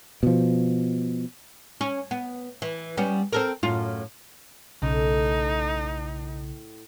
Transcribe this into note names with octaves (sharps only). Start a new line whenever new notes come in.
B2 F3
C#4
B3
E3
G3 B3 C#4
C4 A4 A#4
F#2 A2 F4
B1 A2 C#3 A3 D#4